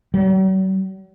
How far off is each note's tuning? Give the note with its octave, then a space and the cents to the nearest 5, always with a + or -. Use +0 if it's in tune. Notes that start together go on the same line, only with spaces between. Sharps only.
F#3 +45